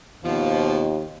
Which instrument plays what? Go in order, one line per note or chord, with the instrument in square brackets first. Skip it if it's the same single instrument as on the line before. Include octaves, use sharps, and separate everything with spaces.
[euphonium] D#2 [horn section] B2 F3